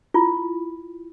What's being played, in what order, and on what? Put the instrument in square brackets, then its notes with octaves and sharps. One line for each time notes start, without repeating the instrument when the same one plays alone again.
[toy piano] E4 F4